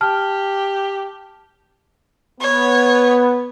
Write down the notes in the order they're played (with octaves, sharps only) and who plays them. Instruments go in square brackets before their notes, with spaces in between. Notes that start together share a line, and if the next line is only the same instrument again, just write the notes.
[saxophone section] G4 [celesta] A5 F6
[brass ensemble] B3 [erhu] C#5